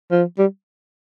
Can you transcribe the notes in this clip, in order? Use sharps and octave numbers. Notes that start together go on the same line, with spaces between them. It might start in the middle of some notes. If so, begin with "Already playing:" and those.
F3
G3